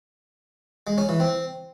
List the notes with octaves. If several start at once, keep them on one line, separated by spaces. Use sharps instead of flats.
G#3
C#4
E3
C4